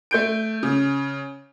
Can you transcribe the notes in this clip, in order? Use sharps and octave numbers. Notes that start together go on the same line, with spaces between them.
A3 G6 D7
C#3